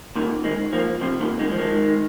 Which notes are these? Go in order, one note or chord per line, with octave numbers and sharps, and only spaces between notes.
A#2 D#3
D#3 G#3
F3 A#3
C3 F3
A#2 D#3
D#3 G#3
F3
D#3 G#3